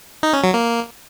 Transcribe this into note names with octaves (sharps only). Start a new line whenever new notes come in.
D#4
C#4
F#3
A#3